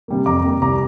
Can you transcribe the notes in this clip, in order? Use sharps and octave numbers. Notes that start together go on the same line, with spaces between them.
C3 G3 A#3
F2 A#5 D6
C3 G3 A#3
C2 A#5 D6